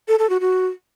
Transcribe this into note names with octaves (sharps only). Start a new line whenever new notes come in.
A4
A4
F#4
F#4